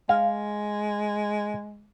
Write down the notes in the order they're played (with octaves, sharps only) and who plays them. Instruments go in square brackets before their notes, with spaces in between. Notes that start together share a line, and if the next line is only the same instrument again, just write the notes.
[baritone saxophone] G#3 [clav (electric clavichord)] F5